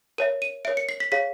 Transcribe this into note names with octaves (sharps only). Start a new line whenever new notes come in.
A#4 C#5 E5 D#7
D#7
A#4 C#5 E5 D7
C#7
C7
B6
G#4 C#5 F5 B6